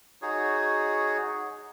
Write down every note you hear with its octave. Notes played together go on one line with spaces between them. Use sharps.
D#4 F#4 G#4 C#5